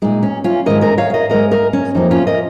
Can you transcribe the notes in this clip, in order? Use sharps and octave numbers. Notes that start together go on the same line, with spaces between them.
A#2 G#3 D#4
C#4
C#4 F4
G#2 D#3 G#3 A#4 D#5
A#4 D#5
C#5 F5
F5
A#4 D#5
G#2 G#3 A#4 D#5
A#4 D#5
C#4
F2 F3 A#3 D#4
C#4 F4
A#4 D#5